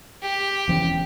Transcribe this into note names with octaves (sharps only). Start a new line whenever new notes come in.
G4
E1 E3 C#4